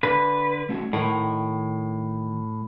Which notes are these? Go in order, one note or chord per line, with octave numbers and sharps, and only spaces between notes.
D3 B4
A3 C#4 F#4
A2 D#3 A#4 F#5